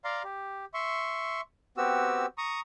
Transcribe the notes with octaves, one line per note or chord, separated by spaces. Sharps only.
D5 F5 A#5 C6
G4
E5 C6 C#6
B3 C4 F#4 G4 E6
A#5 C#6 D#6